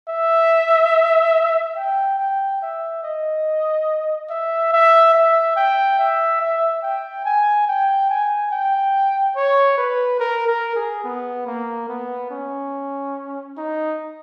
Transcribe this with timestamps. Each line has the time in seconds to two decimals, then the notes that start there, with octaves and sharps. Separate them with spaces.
0.09 E5
1.77 G5
2.19 G5
2.62 E5
3.04 D#5
4.30 E5
4.73 E5
5.14 E5
5.56 G5
5.99 E5
6.41 E5
6.83 G5
7.25 G#5
7.67 G5
8.10 G#5
8.51 G5
9.36 C#5
9.78 B4
10.20 A#4
10.48 A#4
10.76 G#4
11.04 B3
11.47 A#3
11.89 B3
12.31 C#4
13.58 D#4